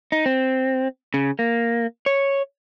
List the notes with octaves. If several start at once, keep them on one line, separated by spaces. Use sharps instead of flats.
D#4
C4
C#3
A#3
C#5